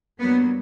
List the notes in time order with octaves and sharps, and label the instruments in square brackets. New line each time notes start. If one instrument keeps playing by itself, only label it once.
[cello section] G2 F#3 A#3 B3